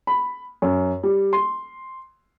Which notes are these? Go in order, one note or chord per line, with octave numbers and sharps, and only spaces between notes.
B5
F#2
G3
C6